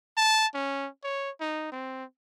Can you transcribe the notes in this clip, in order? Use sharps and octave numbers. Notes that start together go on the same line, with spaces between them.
A5
C#4
C#5
D#4
C4